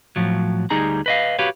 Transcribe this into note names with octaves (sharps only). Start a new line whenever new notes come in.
A2 F3 F#3
D2 G3 D#4 G#4 A#5
B4 D#5 F5
F#4 G4 B4 C#5 F5